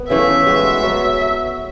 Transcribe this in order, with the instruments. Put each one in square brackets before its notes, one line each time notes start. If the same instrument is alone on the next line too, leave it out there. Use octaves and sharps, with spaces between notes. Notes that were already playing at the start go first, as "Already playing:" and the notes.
Already playing: [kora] B3
[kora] C#3 E3 A3 [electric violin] E5
[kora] G#3 B3 F#4
F#3 B3 F#4 A4